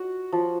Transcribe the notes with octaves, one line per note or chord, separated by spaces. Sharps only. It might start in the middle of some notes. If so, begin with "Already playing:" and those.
Already playing: F#4
F3